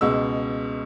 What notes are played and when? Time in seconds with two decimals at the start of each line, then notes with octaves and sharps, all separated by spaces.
0.01 C#2 B2 G#3 E6